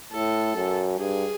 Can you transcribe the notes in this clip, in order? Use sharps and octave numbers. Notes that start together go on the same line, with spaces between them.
A2 A4
F#2
G2 G#4